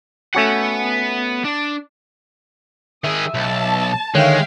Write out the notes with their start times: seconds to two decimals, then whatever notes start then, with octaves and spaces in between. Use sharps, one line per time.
0.35 A3 B3 C#4 F#4 F#5
1.45 D4
3.04 D#3 G#4 E5 D#6
3.34 B1 A5
4.15 D3 D#3 G#3 C#5 E5 F5 G5 F#6